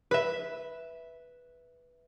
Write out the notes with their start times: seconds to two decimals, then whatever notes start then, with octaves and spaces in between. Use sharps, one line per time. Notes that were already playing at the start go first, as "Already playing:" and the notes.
0.11 B4 E5